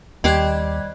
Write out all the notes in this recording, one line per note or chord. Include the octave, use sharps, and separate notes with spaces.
D#2 G3 G4 C5 D#5 D6 F#6 G#6